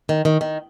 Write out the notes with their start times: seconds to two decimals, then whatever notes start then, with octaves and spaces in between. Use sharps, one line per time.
0.09 D#3
0.25 D#3
0.41 D#3